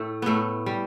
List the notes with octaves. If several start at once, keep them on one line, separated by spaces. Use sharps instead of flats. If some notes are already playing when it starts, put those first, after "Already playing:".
Already playing: A2 A3
A2 A3 B3
G3